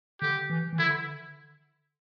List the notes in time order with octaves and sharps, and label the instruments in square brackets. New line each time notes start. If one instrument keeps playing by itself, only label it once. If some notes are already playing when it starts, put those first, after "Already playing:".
[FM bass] D3 [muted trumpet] G4
[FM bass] E3
E3
[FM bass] D3 [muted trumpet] E4